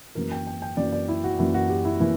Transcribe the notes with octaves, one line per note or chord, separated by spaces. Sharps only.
F#2 E3 A#3 A#4
G5
G5
G5
F#2 E3 A#3 D5
D5
E4
F#4
F#2 E3 A#3 E4
F#4
G4
E4
E3 A#3 E4